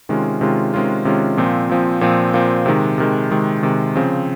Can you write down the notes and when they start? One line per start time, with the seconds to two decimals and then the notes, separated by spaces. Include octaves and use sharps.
0.09 C3 D#3 G#3 C#4 F4
0.41 C3 D#3 G#3 C#4 F4
0.74 C3 D#3 G#3 C#4 F4
1.05 C3 D#3 G#3 C#4 F4
1.37 A#2 F3 C4
1.69 A#2 F3 C4
2.01 A#2 F3 C4
2.34 A#2 F3 C4
2.66 C3 D#3 G#3
2.98 C3 D#3 G#3
3.31 C3 D#3 G#3
3.63 C3 D#3 G#3
3.96 C#3 F3 C4